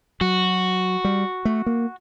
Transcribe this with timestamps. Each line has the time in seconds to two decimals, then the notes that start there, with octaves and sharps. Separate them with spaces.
0.21 F#3 F#4
1.04 G3
1.45 A3
1.66 A#3